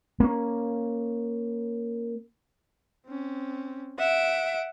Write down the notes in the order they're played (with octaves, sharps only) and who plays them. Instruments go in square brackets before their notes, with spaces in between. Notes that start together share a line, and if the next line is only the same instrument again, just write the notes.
[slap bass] A#3 C#4
[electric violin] C4 C#4
[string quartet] E5 [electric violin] F#5 D7